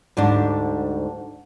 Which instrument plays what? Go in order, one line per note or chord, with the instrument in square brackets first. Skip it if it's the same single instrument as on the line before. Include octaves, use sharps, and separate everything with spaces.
[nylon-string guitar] D2 G#2 G3 D4